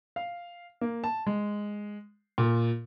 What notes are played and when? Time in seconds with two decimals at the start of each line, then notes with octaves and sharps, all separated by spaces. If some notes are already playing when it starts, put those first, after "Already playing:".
0.16 F5
0.81 A#3
1.04 A5
1.27 G#3
2.38 A#2